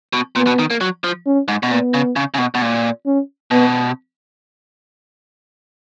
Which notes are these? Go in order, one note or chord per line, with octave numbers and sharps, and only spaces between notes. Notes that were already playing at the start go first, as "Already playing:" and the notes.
B2
A#2 B3
B2
D#3
A#3
F#3
F3
C#4
G#2
B2
A#2 B3
C#3
C#3
C#3
B2
B2
A#2
C#4
B2 B3